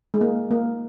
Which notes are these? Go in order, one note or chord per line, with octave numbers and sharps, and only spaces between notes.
G#3
A#3
A#3